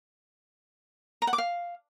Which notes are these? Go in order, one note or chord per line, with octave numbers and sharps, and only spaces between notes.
A#5
F#5
D6
F5